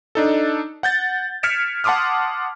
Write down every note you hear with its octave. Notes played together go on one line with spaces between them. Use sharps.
D4 D#4 A4
F#5 G6 A6
F6 G#6 B6 C#7 D7 E7
F#5 A5 C6 D6 D#6 F6